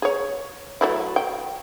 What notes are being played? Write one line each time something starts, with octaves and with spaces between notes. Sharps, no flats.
G#4 C#5
F#3 A3 E4
G5